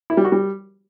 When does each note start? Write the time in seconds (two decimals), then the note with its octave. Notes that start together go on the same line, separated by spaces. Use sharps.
0.10 E4
0.17 G3
0.25 F#4
0.32 G3